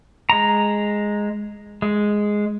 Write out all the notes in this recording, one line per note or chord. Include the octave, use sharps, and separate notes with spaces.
G#3 A#5
G#3